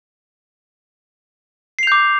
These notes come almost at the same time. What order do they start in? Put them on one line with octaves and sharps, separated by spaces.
C7 F7 G6 D6